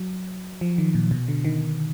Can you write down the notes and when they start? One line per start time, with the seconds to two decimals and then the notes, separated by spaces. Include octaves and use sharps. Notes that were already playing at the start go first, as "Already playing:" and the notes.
Already playing: F#3
0.61 F3
0.78 D#3
0.95 A#2
1.11 B2
1.28 D3
1.45 D#3